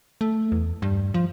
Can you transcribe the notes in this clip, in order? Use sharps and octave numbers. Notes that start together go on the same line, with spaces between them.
A3
E2
G2
F3